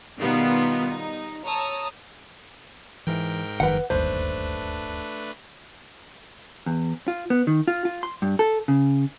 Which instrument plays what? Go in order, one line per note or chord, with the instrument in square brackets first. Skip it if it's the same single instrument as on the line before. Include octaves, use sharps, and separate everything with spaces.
[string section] B2 D#3 G3 B3 D#4 F4
D#4
C#5 A5 A#5 D#6 E6
[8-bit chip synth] G#2 A#4 G5 [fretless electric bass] E3
[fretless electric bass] F#1 D#3 F3 [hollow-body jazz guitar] B4 F#5
[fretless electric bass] D1 G1 D#2 [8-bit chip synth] A3 D4 B4 [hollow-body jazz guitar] C5
[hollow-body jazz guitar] E2
F4
B3
D#3
F4
F4
C6
G2
A4
C#3